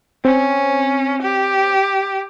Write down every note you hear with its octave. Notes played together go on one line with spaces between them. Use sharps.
C4 C#4
G4